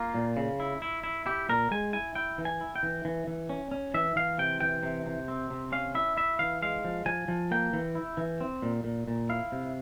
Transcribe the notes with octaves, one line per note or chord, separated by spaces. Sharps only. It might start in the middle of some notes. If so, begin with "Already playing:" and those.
Already playing: A#3 F4
A#2
C#3
E4
E4
E4
E4 G4
A#2 A#4
G#3 G#5
E4 G#5
E4 G5
E3
G#5
E4
G5
E3
E3
E3
C#4
C#4
E3 E5
E3 F5
C3 G5
E3 G5
C3
C3
C4
C3
C#4 F5
E4 E5
E4 E5
E3 F5
G#3 F5
F3
F3 G#5
F3
A#3 G5
E3
E4
E3
C4
A#2
A#2
A#2
E4 F5
C3